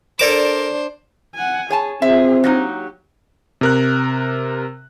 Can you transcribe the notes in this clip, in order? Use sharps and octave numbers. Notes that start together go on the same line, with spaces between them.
D4 A4 A#4 C5 D5 D6 E7
F#5 G#5
G#4 C#5 G#5 A5
C4 F4 G#4 E5
F#3 A#3 D#4 G4
C3 A#4 F#6